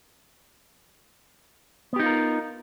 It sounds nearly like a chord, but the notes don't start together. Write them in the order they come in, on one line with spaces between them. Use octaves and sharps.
B3 G4 D#4 F4 A#4